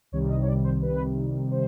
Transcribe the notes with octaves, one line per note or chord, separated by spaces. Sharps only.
C2 C3 D#3 G3 C#5
D#5
C#5
D5
C5
B4
C5